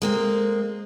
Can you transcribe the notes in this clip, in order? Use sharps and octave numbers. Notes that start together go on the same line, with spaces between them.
G#3 A#3 C4